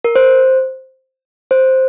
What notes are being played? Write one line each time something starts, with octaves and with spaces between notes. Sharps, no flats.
A#4
C5
C5